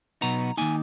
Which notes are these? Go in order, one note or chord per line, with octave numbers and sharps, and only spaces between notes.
B2 F#3 B3 D#4 A#5
D#3 A#3 D#4 G#5